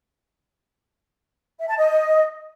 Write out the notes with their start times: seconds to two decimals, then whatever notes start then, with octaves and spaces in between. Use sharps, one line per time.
1.59 E5
1.68 A5
1.77 D#5